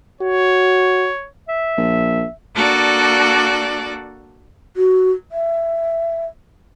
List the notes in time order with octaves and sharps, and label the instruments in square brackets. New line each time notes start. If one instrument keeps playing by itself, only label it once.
[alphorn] F#4 [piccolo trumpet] C#5
[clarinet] E5
[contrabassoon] A#1
[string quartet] A#3 D4 F#4 A4 D5
[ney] F#4
E5